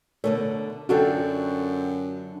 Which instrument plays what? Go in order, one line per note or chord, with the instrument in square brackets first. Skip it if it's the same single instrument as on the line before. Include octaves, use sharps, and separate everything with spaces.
[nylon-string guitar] B2 D3 A3 [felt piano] A#4 C#5
[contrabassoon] F#2 [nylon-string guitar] D3 D4 F4 [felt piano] F#4 A4 G5